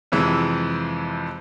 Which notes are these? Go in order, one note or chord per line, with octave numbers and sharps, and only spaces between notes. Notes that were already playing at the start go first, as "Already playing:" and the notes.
F2 C3 E3 G#3